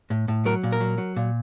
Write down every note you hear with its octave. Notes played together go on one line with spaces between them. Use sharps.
A2
A2
F#3 A#4
A#2
A#4
F#3
F#3
A#2